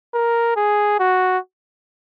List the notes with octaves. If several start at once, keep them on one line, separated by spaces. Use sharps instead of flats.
A#4
G#4
F#4